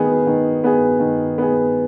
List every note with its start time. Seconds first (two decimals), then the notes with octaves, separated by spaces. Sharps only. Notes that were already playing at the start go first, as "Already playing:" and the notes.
Already playing: D#3 B3 G#4
0.27 D#3
0.64 B3 G#4
1.00 D#3
1.38 B3 G#4